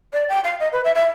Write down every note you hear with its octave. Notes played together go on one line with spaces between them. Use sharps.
D5
G5
F5
D#5
B4
E5
E5